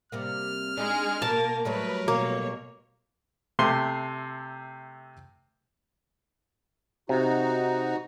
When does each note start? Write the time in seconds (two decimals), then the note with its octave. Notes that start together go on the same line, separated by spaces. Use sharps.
0.12 C3 G3 A#3 F6
0.77 G#3 D4 D#4 G#4
1.22 B2 A#3 A#4 A5
1.65 F#3 G3 A3 A#4 B4
2.08 B2 A#3 C#5
3.59 C3 A3 C6
7.09 C3 D#4 F#4